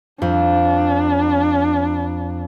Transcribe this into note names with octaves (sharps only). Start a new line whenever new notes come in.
F2 D4